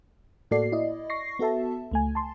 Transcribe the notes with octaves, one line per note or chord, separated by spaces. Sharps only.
A2 A#3 F#4 A4 D5 C7
E4 D5 D#5
C#6 A#6 C7
B3 F#4 A4 E5 A5
C#2 A3 G#5
A5 C6